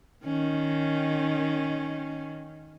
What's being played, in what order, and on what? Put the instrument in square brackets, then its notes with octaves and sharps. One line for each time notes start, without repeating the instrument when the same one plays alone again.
[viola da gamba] D#3 C#4